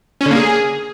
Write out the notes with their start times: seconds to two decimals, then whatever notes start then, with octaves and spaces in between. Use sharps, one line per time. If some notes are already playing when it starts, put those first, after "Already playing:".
0.21 C#4
0.26 D3
0.31 A#3
0.36 G#4